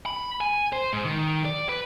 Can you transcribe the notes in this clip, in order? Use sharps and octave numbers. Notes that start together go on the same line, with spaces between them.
B5
G#5
C5
G#2
D#3
D5
B4